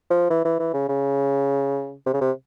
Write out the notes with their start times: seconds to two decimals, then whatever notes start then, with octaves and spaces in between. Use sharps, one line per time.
0.11 F3
0.30 E3
0.45 E3
0.59 E3
0.74 C#3
0.89 C#3
2.06 C3
2.14 C#3
2.21 C3